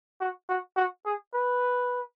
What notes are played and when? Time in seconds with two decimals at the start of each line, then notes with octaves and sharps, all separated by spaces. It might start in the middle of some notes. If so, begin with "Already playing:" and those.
0.21 F#4
0.49 F#4
0.77 F#4
1.05 G#4
1.34 B4